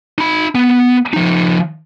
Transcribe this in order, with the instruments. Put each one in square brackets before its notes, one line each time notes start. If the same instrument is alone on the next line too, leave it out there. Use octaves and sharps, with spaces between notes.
[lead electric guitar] D#4 B5
B3
F3 D#4